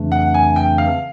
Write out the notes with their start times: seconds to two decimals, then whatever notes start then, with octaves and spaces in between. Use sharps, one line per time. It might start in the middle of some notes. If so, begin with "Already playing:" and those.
Already playing: F2 C#3 E3 A3 D4
0.12 F#5
0.34 G#5
0.56 G5
0.78 F5